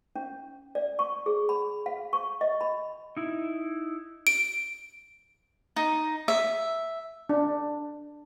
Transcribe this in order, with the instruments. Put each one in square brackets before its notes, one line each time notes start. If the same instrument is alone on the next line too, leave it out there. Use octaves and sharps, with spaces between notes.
[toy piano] C#4
D5
C#6
G#4
B5
F5
C#6
D#5
B5
[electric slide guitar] D#4 E4
[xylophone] D7
[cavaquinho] D#4
E5
[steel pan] D4